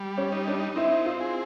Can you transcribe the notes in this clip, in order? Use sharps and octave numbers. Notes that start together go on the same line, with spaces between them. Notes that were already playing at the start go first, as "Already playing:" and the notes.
Already playing: G3
C#4
D#4
D4
C4 E4
F4
G#4